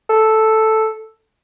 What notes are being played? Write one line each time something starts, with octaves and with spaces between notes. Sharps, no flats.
A4